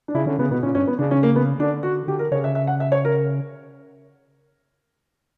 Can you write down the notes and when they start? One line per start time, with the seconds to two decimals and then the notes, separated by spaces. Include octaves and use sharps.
0.08 D4
0.15 C#3 E4
0.26 D3 C#4
0.39 C#3 B3
0.51 B2 B3
0.63 A#2 C#4
0.75 G2 C#4
0.87 B3
0.99 C#3 D4
1.11 C#4
1.23 A#3
1.36 B3
1.59 D3 D4
1.83 F#4
2.08 D3 G4
2.19 A#4
2.32 C#3 C#5
2.44 E5
2.55 E5
2.67 F#5
2.80 E5
2.92 C#5
3.05 A#4